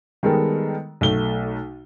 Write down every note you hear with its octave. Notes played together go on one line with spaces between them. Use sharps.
D#3 G3 G#3 B3 A4 A#4
B1 A3 G7